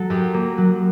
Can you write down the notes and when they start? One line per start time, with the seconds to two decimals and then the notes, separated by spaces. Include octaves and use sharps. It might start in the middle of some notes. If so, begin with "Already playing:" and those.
Already playing: F#3 A4
0.10 F#2 G4
0.34 A#3
0.58 F#3